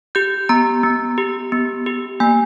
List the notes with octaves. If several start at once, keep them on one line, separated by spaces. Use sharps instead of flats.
G4 G6
B3 A#5
B3
G4
B3
G4
A#3 G#5